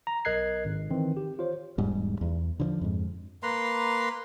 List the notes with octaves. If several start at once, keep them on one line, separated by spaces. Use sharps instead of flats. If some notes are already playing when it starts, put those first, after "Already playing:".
A#5
B1 A#4 D#5 F#6 G#6 C7
G#1
D#3 E3 C4
G4
F4 C5 C#5
E1 G#2 G3
E2
D3 E3 F3
F2 G#2
A#3 B4 A#5 C6